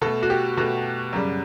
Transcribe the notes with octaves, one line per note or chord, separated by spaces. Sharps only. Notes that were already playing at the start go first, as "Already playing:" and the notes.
B2 A3 A4
F#4
G4
B2 A3 F#4
F#2 C#3 G3